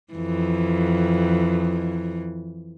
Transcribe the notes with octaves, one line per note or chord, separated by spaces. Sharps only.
F2 E3